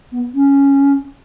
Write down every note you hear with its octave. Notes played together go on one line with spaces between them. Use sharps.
B3
C#4